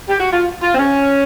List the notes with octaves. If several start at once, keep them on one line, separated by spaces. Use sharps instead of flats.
G4
F#4
F4
F4
C4
C#4